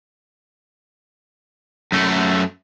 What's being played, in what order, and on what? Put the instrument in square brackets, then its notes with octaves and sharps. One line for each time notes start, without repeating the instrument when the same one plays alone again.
[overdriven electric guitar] F#2 A3